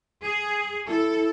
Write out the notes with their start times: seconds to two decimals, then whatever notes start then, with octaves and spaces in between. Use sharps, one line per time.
0.24 G#4
0.90 E4 A4